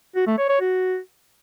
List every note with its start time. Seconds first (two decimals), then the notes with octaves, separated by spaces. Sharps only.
0.16 F#4
0.27 A3
0.38 C#5
0.49 C#5
0.61 F#4